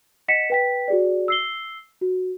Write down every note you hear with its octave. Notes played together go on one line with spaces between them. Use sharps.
D#5 F#5 B6 C#7 E7
B4 G5 B6
F#4 G#4 D5
E6 C7 G7
F#4